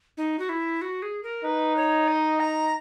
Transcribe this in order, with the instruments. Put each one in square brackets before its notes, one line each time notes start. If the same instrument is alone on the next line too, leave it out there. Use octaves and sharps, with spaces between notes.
[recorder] D#4
F#4
E4
F#4
G#4
A#4
[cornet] D#4 [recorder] B4
[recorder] C#5
D#5
A#5